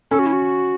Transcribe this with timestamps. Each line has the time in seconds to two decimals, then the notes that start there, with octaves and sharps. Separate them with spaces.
0.11 C#4 A4
0.19 F#4
0.26 E4
0.33 F#4